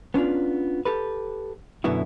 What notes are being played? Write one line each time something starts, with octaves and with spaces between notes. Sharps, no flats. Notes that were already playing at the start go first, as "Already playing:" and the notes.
B3 C#4 D4 F4
G4 A4 B4
F#2 B2 D3 B3 E4 F#4